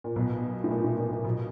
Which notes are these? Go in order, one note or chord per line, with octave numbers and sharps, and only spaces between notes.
A#2
B1 B2
A2
A#2
A2
A#2
A#2
B1 B2